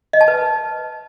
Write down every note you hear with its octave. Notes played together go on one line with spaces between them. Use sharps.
D#5
A5
B4